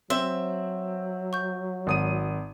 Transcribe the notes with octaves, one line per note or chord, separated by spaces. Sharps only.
F#3 C4 C5 E5 C6
C#6 G6
G#1 D#6 D#7